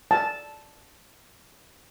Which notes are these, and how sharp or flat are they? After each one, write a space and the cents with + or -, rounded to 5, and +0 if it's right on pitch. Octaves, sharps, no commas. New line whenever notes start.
A5 -5